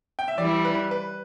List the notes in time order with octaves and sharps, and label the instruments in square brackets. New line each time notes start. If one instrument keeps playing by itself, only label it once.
[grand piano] G5
E5
[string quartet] E3 G3 E4 [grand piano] D5
[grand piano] B4
B4